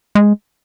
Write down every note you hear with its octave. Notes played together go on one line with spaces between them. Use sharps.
G#3